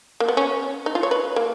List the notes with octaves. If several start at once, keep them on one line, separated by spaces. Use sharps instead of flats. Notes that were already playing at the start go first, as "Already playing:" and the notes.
A#3
B3
C#4
D#4
F4
C#5
B4
A#3